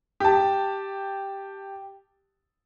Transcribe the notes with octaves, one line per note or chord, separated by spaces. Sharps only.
G4 A5